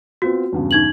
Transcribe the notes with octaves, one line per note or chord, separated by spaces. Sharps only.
B3 C4 F4 F#4
E2 G2 C#3
D#4 G#6 F#7